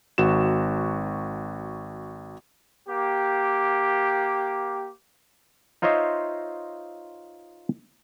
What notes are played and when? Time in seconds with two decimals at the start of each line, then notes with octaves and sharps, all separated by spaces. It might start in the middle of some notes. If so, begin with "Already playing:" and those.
0.18 G#1 F#4 E7
2.88 A#3 G4
5.82 D#4 F4 C5 C#5 D#5 E5